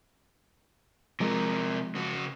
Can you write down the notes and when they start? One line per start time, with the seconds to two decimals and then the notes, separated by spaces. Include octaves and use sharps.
1.20 C3 F3 G#3 A#4
1.95 C#3 F#4